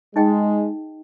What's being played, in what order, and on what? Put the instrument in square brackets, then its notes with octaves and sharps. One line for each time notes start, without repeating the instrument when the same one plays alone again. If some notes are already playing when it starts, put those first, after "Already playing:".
[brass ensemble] G#3 [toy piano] D#4 G#4 D#5 G5